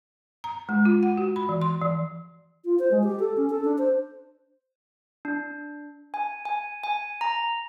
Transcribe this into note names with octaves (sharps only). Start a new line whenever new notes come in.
A#5
G#3
F4
F#5
F#4
B5
E3
C6
E3
F4
C5
G#3
G4
A4
C#4
A4
D4
C5
D4
G#5
G#5
G#5
A#5